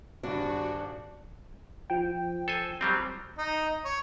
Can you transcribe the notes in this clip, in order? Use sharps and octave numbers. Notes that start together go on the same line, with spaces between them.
D#1 G2 D4 F#4
F3 G5
A4 C5 G#5
F#3 G3 C4
D#4
C#5